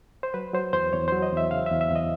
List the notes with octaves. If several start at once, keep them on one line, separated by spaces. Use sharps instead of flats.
C5
F#3 B4
F#3 C5
E2 C5
E2 C#5
F#3 C5
D#5
E2 E5
C#3 F5
E5
E2
E5
E2 D#5